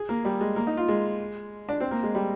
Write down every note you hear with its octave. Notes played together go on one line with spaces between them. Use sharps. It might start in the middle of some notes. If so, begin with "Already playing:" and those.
Already playing: G#4
A#3
G3
G#3
A#3
D#4
F4
G#3
D4
C4
A#3
G#3
G3